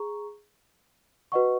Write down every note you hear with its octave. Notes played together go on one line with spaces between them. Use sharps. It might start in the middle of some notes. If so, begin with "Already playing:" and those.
Already playing: G#4 A#5 C#6
F#4 B4 D#5 F#5 C#6